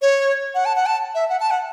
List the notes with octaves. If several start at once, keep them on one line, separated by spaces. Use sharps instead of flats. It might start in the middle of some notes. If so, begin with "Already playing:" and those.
C#5
F#5
A5
F#5
A5
E5
F#5
A5
F#5